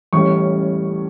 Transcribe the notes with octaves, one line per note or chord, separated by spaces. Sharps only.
A1 A2 G3 C#4 C#6